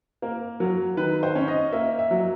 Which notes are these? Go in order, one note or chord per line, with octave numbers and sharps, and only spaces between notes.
A#3 A#4
F#3 A#4
D#3 B4
C5
C#4
D#5
A#3 E5
E5
F#3